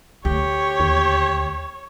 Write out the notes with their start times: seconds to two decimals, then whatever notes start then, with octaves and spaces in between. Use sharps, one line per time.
0.25 D2 G4 C#5
0.80 D#2